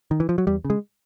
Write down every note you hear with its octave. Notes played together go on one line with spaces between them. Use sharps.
D#3
E3
F3
F#3
E2 G3
C#3
G#3